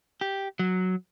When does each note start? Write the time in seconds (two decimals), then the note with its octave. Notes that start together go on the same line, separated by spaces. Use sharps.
0.21 G4
0.59 F#3